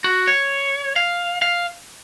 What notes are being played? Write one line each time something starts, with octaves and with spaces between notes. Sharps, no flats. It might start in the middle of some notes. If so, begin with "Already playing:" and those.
F#4
C#5
F5
F5